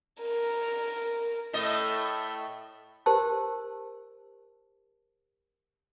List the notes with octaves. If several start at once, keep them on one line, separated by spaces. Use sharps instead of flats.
A#4
A2 A3 D#5
G4 A#4 C5 A5 E6